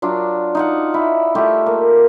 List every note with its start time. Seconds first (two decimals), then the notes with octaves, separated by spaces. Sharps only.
0.02 F#3 D4 F4
0.55 D#4 F4 F#5
0.94 E4
1.35 A3 F4 G4
1.66 A#3